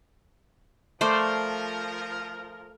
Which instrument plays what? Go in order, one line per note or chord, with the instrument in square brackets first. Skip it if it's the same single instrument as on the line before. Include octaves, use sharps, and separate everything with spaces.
[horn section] F3 A#4 [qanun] A3 C5 D5